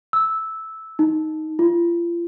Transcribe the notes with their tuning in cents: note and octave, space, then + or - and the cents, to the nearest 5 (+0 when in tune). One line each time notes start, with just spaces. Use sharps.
E6 -10
D#4 +5
F4 -35